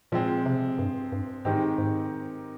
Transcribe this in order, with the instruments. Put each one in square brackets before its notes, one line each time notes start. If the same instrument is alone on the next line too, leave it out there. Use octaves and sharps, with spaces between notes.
[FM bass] A#2 [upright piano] F3 G#3 C4
[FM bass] C3
G2
G2
[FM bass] G#2 [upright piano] D#3 G#3 C4 D#4 G4
[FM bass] G#2